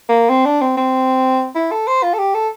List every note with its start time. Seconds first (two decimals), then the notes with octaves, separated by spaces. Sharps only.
0.09 A#3
0.30 C4
0.46 D4
0.61 C4
0.77 C4
1.55 E4
1.71 A4
1.88 C5
2.03 F4
2.13 A4
2.19 G4
2.34 A4